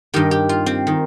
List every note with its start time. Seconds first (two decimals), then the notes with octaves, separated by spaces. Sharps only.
0.14 G2 D#3 G4
0.31 G4
0.49 F4
0.66 C4
0.87 D#3